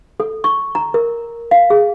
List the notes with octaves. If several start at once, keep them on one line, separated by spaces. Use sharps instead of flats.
A4
C#6
A#5
A#4
F5
G#4